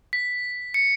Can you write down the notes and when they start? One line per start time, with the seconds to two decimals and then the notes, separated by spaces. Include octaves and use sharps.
0.13 B6
0.74 C#7